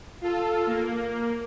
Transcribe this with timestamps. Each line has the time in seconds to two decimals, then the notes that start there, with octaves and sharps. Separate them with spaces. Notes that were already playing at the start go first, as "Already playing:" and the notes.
0.21 F4 A4
0.67 A#3